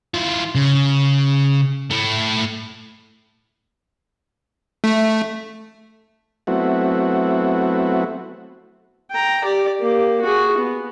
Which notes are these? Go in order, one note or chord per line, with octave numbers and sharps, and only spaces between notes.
E3 F4
C#3
A3 E4
A3
F#3 A3 B3 C4 E4 F#4
G5 A#5
G4 D5
A#3 G4
F#4 G#4
B3